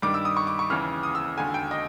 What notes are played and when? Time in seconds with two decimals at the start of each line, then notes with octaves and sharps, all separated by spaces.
0.02 G2 D#3 G3 D6
0.14 E6
0.25 D#6
0.37 C#6
0.47 D6
0.59 C#6
0.70 D#2 C#3 E3 F6
1.03 D#6
1.15 E6
1.37 E1 D#2 D3 G#5
1.54 G5
1.71 D#5